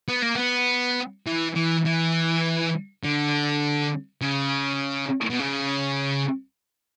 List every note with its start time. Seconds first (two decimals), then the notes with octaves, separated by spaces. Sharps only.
0.08 B3
0.22 A#3
0.35 B3
1.27 E3
1.56 E3
1.86 E3
3.03 D3
4.21 C#3
5.30 B2
5.40 C#3